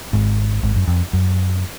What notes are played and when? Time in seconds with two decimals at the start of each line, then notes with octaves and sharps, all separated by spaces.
0.13 G#1 G#2
0.63 G#1 G#2
0.76 F#2
0.88 F2
1.13 F#2